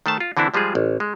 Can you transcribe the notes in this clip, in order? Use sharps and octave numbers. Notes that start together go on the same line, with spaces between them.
D#3 A3 C5 A5
F4
D3 E3 C4 D4 E4
F3 G3 G#3 F4 G#4
A1
G#3